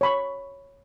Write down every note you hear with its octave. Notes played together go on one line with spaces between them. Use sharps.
C#5 B5 C#6